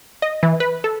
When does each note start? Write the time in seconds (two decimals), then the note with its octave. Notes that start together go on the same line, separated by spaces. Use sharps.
0.22 D#5
0.43 E3
0.60 B4
0.84 A4